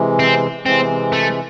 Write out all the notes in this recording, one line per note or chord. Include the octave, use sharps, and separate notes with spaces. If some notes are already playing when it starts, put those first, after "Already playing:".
Already playing: C3 E3 G#3
C4
C3 E3 G#3 C4
A3